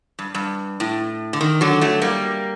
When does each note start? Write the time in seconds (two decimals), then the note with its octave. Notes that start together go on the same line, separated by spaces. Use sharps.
0.19 G2
0.35 G2
0.80 A2
1.33 D3
1.41 D#3
1.61 D3 F#3
1.81 F#3 A3
2.01 G3 A#3